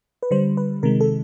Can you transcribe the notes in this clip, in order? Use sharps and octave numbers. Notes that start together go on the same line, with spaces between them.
B4
D3 G3 C5
B4
C3 D#3 G#3 A#4
A4